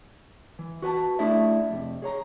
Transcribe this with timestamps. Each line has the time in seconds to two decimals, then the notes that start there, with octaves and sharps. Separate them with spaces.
0.59 E3
0.82 F#4 B4 G#5 A5
1.19 A3 D4 E4 G#4 D5 E5
1.70 F2 C3
2.02 G#4 C#5 A#5